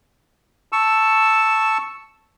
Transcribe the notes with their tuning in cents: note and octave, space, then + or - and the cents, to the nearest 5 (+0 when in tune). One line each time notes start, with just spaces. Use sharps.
A5 +0 C#6 +0 E6 +0